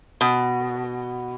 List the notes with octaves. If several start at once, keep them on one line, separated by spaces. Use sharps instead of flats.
B2